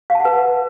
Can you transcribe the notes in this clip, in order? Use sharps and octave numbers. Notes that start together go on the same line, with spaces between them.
F5
A5
F#5
B4